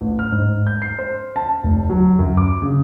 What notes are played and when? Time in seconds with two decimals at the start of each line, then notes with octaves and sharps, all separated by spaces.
0.01 A1
0.19 F6
0.32 G#2
0.67 G6
0.82 C7
0.99 C5
1.36 A5
1.63 F1
1.90 F#3
2.19 F#2
2.37 D6
2.62 C#3